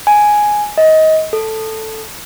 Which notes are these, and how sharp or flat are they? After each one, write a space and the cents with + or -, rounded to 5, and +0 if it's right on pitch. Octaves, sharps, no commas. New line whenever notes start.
G#5 +5
D#5 +20
A4 +5